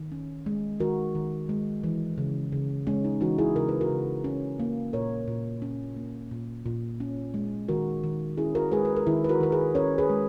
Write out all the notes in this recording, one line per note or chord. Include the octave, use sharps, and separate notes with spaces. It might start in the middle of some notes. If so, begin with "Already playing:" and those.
Already playing: D#3
C#4
G#3
D#3 F#4 A#4
D#3
G#3
E3
C#3
C#3
G#3 C#4
D#4
E3 D#4 F#4
E4 G#4
C#3 A#4
B4
F#4 A#4
C#3
C#4
A#3
A#2 A#4 C#5
A#2
C#4
A#3
A#2
A#2
C#4
G#3
D#3 F#4 A#4
D#3
C#4 E4 G#4
F#4 A#4
G#3 G#4 B4
B4
A#4
D#3 E4 G#4
B4
F#4 A#4
D#3 A#4
G#4 B4
C#4 A#4 C#5
G#4 B4
G#3